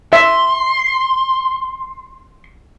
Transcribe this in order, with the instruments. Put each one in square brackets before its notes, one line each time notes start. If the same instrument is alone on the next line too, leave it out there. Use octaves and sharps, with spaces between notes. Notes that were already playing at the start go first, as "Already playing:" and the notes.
[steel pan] E5 [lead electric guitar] C6